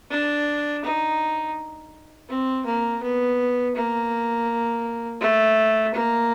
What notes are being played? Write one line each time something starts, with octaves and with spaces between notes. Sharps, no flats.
D4
D#4
C4
A#3
B3
A#3
A3
A#3